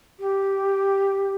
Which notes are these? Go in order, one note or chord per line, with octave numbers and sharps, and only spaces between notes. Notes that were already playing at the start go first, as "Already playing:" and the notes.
G4